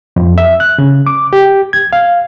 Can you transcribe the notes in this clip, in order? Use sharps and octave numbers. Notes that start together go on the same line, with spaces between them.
F2
E5
F#6
C#3
D6
G4
G#6
F5